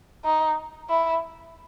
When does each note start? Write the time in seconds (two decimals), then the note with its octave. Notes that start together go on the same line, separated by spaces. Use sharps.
0.25 D#4
0.90 E4